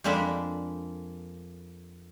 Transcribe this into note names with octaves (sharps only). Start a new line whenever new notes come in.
F2 G#3 A#3 D4 A4 B5